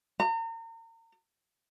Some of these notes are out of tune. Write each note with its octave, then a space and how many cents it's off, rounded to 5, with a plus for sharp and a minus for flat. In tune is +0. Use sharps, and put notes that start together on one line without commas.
A#5 -40